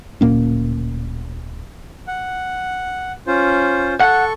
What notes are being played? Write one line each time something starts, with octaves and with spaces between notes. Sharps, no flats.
D1 A#2 A#3 C#4
F#5
C#4 F4 C5
A4 F#5 C#6